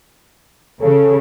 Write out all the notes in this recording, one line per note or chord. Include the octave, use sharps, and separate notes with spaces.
C#3 A4